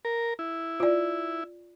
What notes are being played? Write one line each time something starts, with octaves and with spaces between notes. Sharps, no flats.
A#4
E4
F4 D5